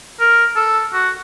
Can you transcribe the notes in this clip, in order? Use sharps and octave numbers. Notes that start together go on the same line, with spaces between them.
A#4
A4
F#4